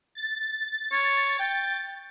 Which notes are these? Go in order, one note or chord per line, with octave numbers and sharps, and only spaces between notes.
A6
C#5
G5